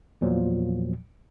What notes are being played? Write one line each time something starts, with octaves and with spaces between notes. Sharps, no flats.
E2 A#2 F3 F#3